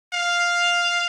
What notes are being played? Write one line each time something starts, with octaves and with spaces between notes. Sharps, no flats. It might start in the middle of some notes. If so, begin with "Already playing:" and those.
F5